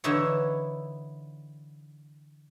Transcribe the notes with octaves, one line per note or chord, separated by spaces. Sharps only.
D3 E3 D#4 E4 C#5